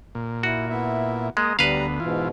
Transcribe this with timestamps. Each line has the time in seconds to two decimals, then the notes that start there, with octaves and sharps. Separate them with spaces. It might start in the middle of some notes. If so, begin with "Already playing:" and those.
0.15 A#2
0.43 E4 F#4
0.69 B3 E4 E5
1.37 G#3 A#3 D#5
1.59 D2 G3 B3 B4 F5 A#5
2.00 G#2 B2 E3 F4